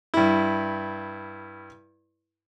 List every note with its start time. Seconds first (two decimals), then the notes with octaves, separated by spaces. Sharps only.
0.14 G2 E4